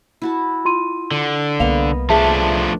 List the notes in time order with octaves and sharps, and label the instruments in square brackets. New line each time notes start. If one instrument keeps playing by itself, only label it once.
[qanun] E4 F#4 A5
[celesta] F4 C6 D#7
[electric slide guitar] D3
[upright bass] C2 [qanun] A#3 B3 D#5 [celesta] F5 F7
[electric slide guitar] F3 A3 D4 [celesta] G#4 E5 A5